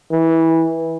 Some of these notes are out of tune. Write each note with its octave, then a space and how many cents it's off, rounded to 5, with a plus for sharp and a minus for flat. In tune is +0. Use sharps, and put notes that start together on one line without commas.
E3 -15